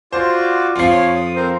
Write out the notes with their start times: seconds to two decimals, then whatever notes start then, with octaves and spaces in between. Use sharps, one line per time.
0.12 F4 F#4 C5 D5
0.76 F2 F3 F4 C7
0.90 C#5 C6
1.15 D#6
1.36 C4 A#4 C5